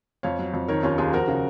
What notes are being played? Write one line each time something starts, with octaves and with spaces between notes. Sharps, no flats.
F2 C#5 F5
F#3
F2
D#3 A#4 C#5
D#2 C#4 F4
D#2 F4 G#4
F3 F#4 A#4
C#3